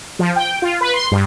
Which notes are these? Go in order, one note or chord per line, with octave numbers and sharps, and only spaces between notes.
F3
G5
F4
B4
C6
G2